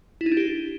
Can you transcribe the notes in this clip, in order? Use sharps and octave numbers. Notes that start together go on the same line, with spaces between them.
E4
D#4
D4
G4